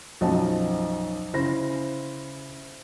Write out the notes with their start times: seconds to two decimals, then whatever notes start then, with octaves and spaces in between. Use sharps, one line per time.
0.21 B1 F#2 F3 C5 D#5 A5
1.33 C#3 E4 C5 A#6